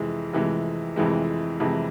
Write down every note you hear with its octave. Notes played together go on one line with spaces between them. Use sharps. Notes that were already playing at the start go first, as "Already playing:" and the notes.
Already playing: F2 C3 E3 G#3
F2 C3 E3 G#3
F2 C3 E3 G#3
F2 C3 E3 G#3